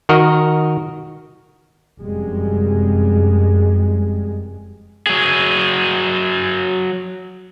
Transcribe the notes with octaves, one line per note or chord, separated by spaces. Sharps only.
D#3 F#4 A#4 D#5
F1 F#2 G3 G#3
F#3 G#4